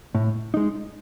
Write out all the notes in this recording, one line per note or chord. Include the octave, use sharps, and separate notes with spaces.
A2
G#3 D#4